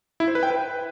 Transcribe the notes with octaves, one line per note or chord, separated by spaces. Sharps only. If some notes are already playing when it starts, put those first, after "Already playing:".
E4
C5
B4
G5
B4